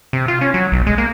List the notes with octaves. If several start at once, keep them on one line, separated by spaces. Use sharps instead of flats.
C3
F4
C#4
F#3
B1
G#3
A#3